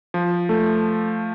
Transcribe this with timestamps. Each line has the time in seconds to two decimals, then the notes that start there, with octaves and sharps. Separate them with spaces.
0.14 F3
0.49 A3